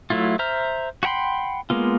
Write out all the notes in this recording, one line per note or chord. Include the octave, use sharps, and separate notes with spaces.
F#3 A3 E4 F4
C5 E5 A#5 F6
F#4 F#5 G5 B5 C6
G#3 A#3 B3 F4